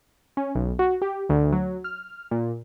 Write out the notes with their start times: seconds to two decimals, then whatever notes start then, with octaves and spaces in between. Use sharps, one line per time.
0.37 C#4
0.55 B1
0.79 F#4
1.02 G4
1.29 D2
1.52 F#3
1.84 F6
2.31 A#2